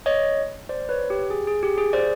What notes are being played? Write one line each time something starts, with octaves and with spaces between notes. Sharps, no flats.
C#5 D#5
C5 D5
B4 C#5
G4
G#4
G#4
G4
G#4
C5 D5